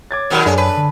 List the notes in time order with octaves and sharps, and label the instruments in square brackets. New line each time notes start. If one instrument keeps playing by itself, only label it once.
[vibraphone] C#5 [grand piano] D6 G#6 A6
[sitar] D#2 B2 F#3 [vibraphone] A#4 F#5
[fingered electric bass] F#2 [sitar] G#3 [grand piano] D4 A4 [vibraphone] C#5 G#5
[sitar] B4 [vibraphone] A5
[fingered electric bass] D3